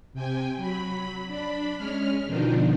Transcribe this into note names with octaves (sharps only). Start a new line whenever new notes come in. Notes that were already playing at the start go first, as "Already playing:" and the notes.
C3 G5 G#5
F#3 B5
D4 B5
G#3 C#4 F6
B2 D3 D#3 F3 D4 D#4